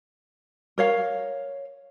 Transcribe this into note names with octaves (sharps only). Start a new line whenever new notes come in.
A#4 C#5 F5